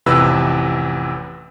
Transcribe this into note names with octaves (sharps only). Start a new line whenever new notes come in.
A1 F2 C3 E3 B4 E6